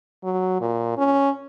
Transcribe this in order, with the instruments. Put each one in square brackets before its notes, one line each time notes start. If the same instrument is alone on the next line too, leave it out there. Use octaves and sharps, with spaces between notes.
[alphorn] F#3
A#2
C#4